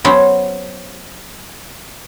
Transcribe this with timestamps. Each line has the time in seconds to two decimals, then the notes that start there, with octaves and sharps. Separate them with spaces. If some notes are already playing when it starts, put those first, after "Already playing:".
0.04 F#3 B3 C#4 C5 G5